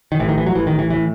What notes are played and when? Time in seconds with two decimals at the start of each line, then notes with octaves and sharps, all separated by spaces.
0.12 D#3
0.19 A1 A2 E3
0.29 D#3
0.38 E3
0.46 F#3
0.55 A1 A2 E3
0.67 D#3
0.79 E3
0.90 A2 E3